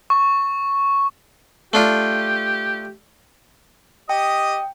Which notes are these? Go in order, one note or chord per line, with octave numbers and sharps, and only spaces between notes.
C#6
A3 D4 F4 G4
G4 D#5 G5 D#6